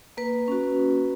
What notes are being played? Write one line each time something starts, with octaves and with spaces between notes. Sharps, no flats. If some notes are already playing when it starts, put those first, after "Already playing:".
A#3 B4
C#4 F#4